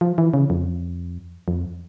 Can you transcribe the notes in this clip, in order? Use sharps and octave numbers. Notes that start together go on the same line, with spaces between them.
F3
E3
C#3
F2
F2